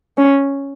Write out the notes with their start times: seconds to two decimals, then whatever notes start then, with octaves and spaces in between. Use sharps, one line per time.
0.18 C#4